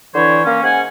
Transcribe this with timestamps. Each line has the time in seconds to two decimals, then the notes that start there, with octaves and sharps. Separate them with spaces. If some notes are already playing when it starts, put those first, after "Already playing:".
0.15 D3 E3 E4 C5 C#5
0.45 A#3 C#4
0.63 G#2 C#4 F#5 G#5